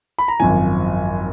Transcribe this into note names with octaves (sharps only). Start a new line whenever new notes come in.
B5
A#5
G#1 F#2 F3 G#5